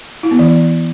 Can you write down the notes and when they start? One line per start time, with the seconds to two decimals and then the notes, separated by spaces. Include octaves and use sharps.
0.23 E4
0.31 B3
0.39 E3